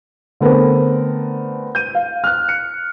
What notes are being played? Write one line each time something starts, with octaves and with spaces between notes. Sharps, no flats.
D3 A3 B3 C4 A#4
G6 D#7
F5
F6 F#6
C#7